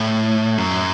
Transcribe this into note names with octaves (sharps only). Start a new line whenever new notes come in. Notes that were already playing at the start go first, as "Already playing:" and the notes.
Already playing: A2
F#2